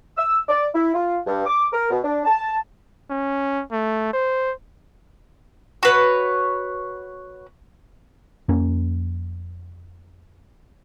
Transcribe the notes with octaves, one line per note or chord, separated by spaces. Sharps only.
E6
D5
E4
F4
G2
D6
A#4
B2
D4
A5
C#4
A3
C5
F#4 B4 C#5
F2 A#3 C#4